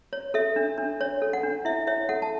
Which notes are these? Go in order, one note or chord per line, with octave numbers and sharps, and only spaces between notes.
C#5
A4 E5
D4
D4
C#5
A4
F#5
D4
E4 E5
C#5 E5
A4 F#5
A5